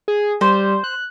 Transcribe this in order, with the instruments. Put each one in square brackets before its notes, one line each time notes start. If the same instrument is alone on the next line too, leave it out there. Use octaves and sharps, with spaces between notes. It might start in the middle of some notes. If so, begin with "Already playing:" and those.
[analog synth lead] G#4
[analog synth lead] G3 [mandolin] C5
[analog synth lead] F#6